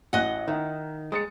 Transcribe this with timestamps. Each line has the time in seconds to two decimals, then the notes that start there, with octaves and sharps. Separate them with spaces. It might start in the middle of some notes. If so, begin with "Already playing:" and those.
0.13 A1 F#4 D#5 F#5 F#6
0.48 D#3 D#4 E5
1.12 G#3 D#6 A6 C#7